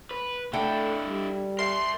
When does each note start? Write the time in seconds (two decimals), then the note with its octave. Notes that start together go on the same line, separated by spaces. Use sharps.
0.11 B4
0.53 A3 D4 E4 A4 F#5 G5
1.06 G3
1.59 A#4 E5 C6